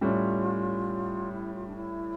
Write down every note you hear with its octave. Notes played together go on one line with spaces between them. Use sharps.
A2 G3 C#4 F4
E4
F4
D4
E4